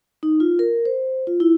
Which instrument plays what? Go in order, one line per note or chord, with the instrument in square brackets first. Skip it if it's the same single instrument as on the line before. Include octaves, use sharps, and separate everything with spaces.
[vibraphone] D#4
F4
A#4
C5
F4
E4